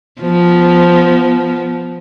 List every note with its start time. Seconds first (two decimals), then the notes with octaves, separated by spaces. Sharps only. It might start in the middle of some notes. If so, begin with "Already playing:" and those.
0.21 F3 B3